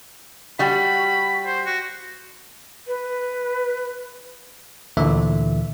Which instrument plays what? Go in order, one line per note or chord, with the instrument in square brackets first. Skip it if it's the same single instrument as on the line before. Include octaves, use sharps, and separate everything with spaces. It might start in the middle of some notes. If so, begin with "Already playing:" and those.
[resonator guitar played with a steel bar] G3 F#4 [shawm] B5
[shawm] C5
F#4
[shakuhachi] B4
[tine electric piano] D2 A#2 D3 E3 E5